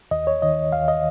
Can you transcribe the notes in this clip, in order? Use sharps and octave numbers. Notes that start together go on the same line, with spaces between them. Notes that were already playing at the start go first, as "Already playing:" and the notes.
D#2 D#5
C#5
D#3 D#5
D#2 F5
D#5